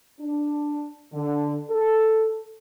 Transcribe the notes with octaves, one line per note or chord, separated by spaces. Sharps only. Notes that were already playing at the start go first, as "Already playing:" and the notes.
D4
D3
A4